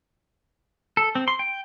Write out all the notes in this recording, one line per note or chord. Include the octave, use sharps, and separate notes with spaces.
A4
C4
C6
G5